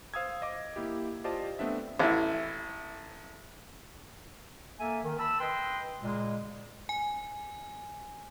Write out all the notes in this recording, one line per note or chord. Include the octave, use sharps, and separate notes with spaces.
C5 F5 D#6 E6 G#6
D#5 D6
A#3 E4 G4
F4 G4 C5 D5 D#5 A5
A3 B3 C4 D4 E5
A1 E4
A#3 A4 E5 G#5
D#3
A5 B5 E6
B4 D#5 G5 C6
A#2 C#3 G#3
G#5